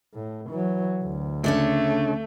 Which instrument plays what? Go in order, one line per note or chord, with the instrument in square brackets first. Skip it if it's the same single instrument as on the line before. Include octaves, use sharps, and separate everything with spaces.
[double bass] A2
E3 F#3
D2
[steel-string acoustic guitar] C#3 D4 C#5 [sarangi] A3